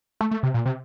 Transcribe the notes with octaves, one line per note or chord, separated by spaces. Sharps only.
A3
A3
C3
A#2
C3